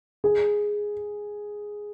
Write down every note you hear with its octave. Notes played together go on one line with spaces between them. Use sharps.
G#4